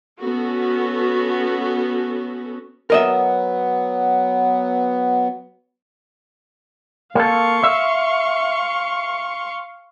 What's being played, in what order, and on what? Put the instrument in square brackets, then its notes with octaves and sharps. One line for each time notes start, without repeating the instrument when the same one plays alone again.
[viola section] B3 C#4 F#4 A4
[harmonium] F#3 B3 [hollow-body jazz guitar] A#4 D#5 E5
[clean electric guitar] A#3 A4 [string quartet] F5 C6 C#6
[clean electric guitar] E5